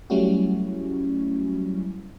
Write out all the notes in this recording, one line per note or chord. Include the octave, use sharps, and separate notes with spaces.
F#3 G3 A3 C#4 E4 F#4